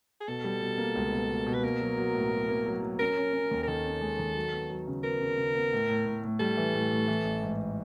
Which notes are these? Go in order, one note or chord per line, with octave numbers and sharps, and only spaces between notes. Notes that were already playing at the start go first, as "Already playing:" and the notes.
G#4
B2 A4
G3
B2
A#3
C#2
B2
B2
B2
B4
A#3 A#4
F#3
F#3
A2
F#3
A#3
F#3
F#3
C#4 A#4
C#4
C#4
D#2
A#4
D#3 A4
C#4
G#3
D#3
F#3
B3
F#3
C#3
B3 A#4
C#3
C#3
B3
A2
A2
A2
A2
G3 A4
E3
A2
A2
E3
A1
G#2